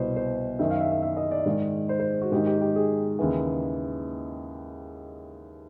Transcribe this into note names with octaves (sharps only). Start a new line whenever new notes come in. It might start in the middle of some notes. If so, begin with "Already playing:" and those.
Already playing: C2 B2 C5
C5
F#2 D#3 E5
F5
E5
E5
E5
D#5
D5
G#2 D#3
C5
C5
F#4
G#2 D#3 G4
G4
G4
G#4
D#2 C#3 E3